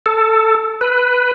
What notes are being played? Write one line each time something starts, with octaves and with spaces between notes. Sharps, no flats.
A4
B4